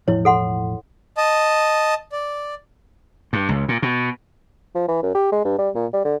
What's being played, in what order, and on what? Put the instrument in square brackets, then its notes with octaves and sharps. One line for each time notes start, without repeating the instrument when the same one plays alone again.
[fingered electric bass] E1 A2 F3 [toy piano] E4 C#5
[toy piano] A4 F#5 C6
[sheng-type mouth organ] D#5 A5
D5
[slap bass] G2
C#2
A#2
B2
[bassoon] F3
E3
F#2
G4
G#3
G2
G3
A#2
G3
D3